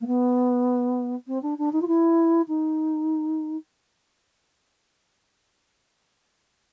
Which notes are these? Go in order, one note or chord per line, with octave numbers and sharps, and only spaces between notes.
A#3
B3
C4
D4
D4
D#4
F4
E4
D#4